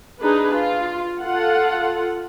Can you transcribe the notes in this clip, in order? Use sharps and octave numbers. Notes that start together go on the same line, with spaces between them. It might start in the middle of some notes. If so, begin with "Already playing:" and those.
D4 D#4 G#4 B4
F4
F4 A4 F#5